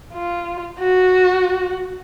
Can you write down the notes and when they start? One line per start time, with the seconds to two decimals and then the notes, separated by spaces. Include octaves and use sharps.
0.13 F4
0.80 F#4